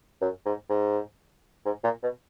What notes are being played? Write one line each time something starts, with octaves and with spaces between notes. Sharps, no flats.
F#2
G#2
G#2
G#2
A#2
B2